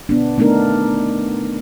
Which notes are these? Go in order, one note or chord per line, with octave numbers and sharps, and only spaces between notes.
B3 D4
A3 B3 D4 D#4 A#4